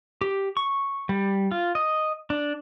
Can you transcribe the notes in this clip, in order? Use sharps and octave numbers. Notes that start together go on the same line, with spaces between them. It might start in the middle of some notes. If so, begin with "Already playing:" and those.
G4
C#6
G3
F4
D#5
D4